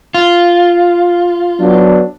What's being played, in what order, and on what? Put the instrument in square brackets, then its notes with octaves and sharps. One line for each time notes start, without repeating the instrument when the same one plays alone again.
[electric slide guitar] F4
[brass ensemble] F#3 B3 D4